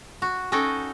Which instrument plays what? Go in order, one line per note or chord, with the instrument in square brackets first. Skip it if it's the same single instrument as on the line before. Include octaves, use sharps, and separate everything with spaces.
[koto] F#4
C#4 D#4 F#4 A4 G5